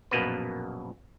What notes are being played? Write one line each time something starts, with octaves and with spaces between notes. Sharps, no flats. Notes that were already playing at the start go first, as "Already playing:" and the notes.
A#1 F#2 B2 A#3 B3 B4